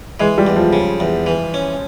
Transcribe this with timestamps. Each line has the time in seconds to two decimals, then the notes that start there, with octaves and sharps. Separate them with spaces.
0.20 E3 G#3
0.38 G3
0.47 E2
0.56 F3
0.73 C#3
1.00 E2
1.26 E3
1.54 C#4